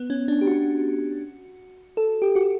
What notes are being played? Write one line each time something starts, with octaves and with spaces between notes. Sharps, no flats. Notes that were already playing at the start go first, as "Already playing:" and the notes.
Already playing: B3
C#4
D4
G4
F#4
A4
G4
F#4